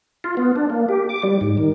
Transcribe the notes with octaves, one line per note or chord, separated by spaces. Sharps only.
F4
B3
D4
A#3
G4
D6
G3
G#2
D#3